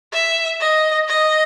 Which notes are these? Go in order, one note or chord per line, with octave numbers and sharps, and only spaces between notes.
E5
D#5
D#5